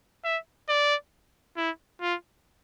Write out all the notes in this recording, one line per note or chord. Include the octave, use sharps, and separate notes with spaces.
E5
D5
E4
F4